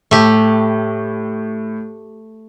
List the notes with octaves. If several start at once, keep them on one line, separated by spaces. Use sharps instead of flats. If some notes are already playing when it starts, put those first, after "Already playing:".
A2 A3 G4